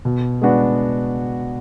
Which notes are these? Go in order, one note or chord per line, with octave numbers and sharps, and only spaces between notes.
B2
G#3 B3 D4 F#4